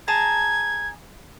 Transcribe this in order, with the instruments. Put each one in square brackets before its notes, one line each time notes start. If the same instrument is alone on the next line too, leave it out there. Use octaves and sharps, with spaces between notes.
[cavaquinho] G#4 A5 A#5 [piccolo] G#6